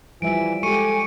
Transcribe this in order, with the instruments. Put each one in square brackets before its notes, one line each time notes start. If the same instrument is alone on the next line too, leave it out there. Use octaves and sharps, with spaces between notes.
[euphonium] E3 [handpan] F3 G3 E5 [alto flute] G#5 [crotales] D7
[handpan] G#3 G4 [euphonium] A4 [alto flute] G#5 [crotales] C#6 C#7 D#7